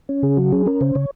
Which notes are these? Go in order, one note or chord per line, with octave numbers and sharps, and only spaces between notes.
C#4
C#3 G#4
F#3 F#4
C#4 G#4
C#4 A#4
C#3 C5
C#3 C#5